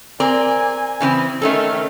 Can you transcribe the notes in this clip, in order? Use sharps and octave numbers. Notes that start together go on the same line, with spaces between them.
C4 A#4 D5 G#5
C#3 E3 C4
D#3 A3 C#4 A4